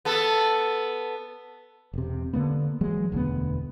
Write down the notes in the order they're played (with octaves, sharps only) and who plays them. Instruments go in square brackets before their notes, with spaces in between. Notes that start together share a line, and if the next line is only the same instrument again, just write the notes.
[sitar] B3 A4
[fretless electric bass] E1 C3
D3 F#3 A#3 B3
E3 F#3 G#3
E1 D2 G#3 B3